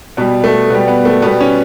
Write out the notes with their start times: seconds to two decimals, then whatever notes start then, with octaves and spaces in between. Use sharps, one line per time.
0.17 B2 G3 B3
0.44 A3
0.70 B2 G3 B3
0.88 B3
1.05 A3
1.22 B2 G3 B3
1.41 C#4